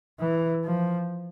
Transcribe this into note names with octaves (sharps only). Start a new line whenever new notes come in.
E3
F3